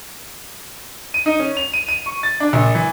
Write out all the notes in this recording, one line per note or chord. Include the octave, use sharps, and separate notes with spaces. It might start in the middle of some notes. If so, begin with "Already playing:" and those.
D#7
D#4
C#4
F7
D#7
D#7
C#6
A6
D4
A#1
E3